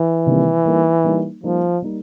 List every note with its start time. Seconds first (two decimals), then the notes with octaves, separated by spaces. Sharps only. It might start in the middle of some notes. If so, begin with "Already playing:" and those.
Already playing: E3
0.26 C3 D#3 G3 A#3
0.65 G3 A#3 D#4
1.04 G3 A#3 D#4
1.43 F3 G3 A#3 D#4
1.82 G3 A#3 D#4